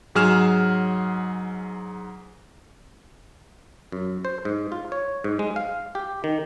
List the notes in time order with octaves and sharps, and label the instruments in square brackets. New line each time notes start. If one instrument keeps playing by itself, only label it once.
[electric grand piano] G#2 F#3 G#4 F6 E7
[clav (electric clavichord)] F#2
C5
G#2
F4
C#5
G#2
G#3
F5
G4
D#3